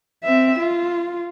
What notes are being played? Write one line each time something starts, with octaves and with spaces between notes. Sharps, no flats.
C4 E5
F4